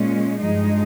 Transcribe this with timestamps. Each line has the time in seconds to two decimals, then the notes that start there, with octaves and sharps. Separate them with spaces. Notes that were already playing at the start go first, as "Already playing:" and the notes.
Already playing: A#2 G#3 C#4
0.39 G2 F3 G#3 D#4